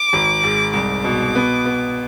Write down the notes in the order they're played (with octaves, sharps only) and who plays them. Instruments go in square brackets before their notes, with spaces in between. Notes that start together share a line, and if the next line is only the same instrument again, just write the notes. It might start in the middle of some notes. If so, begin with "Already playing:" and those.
Already playing: [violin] D6
[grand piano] G#1
G#2
[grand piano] C2 [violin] D6
[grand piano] B2
B3
B3